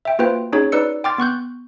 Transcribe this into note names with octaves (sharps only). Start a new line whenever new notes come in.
E5 G5
A#3 F4 F#4 B4 C5 G5
C#4 D#4 F#4 G#4 C#5
D#4 B4 D5 E6 C#7
G5 C6 D6 F6 A6
B3 C#6 F#6 G6